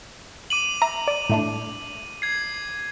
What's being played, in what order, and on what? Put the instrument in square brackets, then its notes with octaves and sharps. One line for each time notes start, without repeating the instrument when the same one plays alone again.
[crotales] D6 D#7 F#7
[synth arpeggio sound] E5 A#5
D5
A2 A3 D4
[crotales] G#6 C7